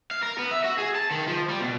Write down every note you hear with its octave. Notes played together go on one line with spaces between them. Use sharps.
F5
A#4
B3
E5
F#4
G#4
A5
D#3
F3
G3
B2